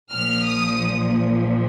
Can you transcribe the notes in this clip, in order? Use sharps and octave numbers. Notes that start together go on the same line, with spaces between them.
A#1 A#2 F3 F6
D#6